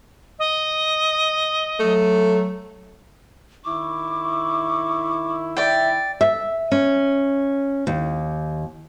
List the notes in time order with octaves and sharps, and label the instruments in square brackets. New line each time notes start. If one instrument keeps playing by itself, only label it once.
[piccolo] D#5
[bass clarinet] F#3 [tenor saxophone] A3
[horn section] D#3 E4 [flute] C#6 [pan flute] D6
[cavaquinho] D5 G5 [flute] E5
[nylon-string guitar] E5
C#4
D#2